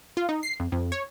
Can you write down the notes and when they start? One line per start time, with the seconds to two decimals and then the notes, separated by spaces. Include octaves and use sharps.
0.17 F4
0.29 D#4
0.43 C7
0.60 F2
0.72 F2
0.92 C#5